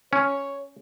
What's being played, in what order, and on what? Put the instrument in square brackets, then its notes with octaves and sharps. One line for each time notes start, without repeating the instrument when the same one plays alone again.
[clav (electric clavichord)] C#4 [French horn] C#5